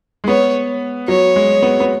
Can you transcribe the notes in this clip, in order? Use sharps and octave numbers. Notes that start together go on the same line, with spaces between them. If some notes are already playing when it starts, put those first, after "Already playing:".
G#3
B3 C#5
F#3 C#5
G#3
B3
B3